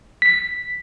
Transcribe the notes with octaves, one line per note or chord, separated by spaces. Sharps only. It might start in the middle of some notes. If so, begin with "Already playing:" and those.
B6